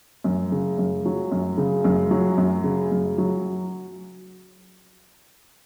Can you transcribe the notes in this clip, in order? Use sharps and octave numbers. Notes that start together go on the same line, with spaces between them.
F#2
C#3
F#2
F#3
F#2
C#3
F#2
F#3
F#2
C#3
F#2
F#3